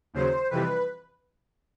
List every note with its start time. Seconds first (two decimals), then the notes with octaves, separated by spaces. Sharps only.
0.14 D#2 C#3 F#3 C5
0.50 F2 C3 E3 G3 B4